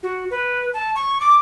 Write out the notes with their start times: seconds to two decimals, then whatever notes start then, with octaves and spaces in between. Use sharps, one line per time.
0.03 F#4
0.31 B4
0.74 A5
0.95 C#6
1.20 D6